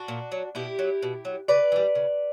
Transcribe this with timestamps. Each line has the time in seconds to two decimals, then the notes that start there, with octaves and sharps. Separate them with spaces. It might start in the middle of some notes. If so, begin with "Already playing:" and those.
Already playing: D4 F#4
0.08 A#2
0.32 F#3
0.55 B2 E4 G4
0.79 F#3
1.03 B2
1.25 F#3
1.48 C#3 B4 D5
1.72 E3 G3
1.95 C#3